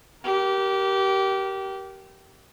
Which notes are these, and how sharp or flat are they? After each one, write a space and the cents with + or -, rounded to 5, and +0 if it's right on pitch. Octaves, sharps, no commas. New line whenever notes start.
G4 -20 A#4 +15